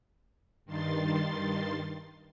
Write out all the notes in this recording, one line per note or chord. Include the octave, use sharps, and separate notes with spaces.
G2 D#3 C6 A6